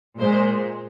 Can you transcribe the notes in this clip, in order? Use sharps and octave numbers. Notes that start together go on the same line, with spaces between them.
A#2 G#3 C5